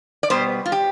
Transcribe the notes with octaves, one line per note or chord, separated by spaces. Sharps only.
D5
B2 G3 B3 C5
F4
G4